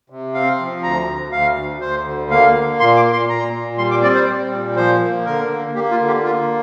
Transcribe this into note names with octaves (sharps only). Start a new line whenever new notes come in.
C3
C4 F5
F3
D2 A#5
D2
D2 F5
D2
D2 C5
D3
A#3 F5
A#3
A#2 C6
D6
A#2
C6
A#2 A#5
A#2
G3 C6
D6
C4 D5
C5
G3
A#2
F3 C5
A#3
D3 A#4
A#3
A#3 G4
F4
D3
G4
A#3 F4